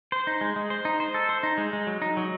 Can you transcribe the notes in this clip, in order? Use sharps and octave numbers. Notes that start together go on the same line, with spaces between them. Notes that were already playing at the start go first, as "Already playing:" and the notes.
C5
D#4
G#3
G#3
C5
D#4
C5
A4
C5
D#4
G#3
G#3
F#3
D#4
F#3